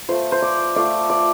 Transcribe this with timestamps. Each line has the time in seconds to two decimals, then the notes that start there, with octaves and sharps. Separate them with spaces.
0.09 A3 F4 C5
0.32 C5
0.42 D5
0.76 A3 F4 D5
1.10 D5